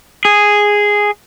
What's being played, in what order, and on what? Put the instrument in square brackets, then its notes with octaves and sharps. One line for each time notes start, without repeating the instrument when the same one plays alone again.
[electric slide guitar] G#4